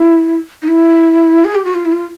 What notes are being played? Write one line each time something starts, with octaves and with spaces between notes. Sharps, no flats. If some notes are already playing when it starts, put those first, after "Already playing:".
Already playing: E4
D#4
E4
G#4
G4
F#4
F4
E4
F4